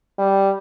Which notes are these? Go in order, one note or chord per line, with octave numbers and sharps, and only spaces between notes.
G3